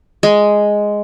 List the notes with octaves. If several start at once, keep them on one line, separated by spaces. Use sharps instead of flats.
G#3